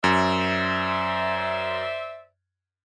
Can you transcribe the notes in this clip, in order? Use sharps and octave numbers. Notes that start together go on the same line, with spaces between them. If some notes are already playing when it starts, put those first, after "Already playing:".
F#2 C5 D5 E5